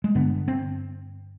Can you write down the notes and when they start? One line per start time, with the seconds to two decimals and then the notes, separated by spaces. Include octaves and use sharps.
0.04 G#3
0.15 G2 D3 B3
0.48 C4